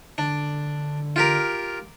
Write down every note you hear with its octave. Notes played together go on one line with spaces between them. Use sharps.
D3 D4
F4 G4 A#4